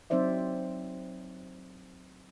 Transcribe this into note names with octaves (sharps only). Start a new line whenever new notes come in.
F#3 C4 D#4 C5 D5 E5